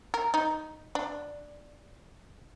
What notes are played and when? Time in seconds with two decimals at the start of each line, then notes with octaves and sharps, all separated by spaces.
0.14 A#4
0.34 D#4
0.95 D4